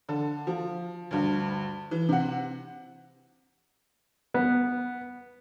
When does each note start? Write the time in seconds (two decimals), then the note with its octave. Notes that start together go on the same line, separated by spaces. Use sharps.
0.09 D3 A4
0.47 F3
1.11 D2 G2
1.91 E3
2.09 C3 F#5
4.34 B3